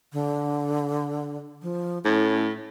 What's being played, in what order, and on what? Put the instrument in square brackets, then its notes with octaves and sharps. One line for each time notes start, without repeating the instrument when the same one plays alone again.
[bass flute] D3
F3
[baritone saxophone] A2 [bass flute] C#4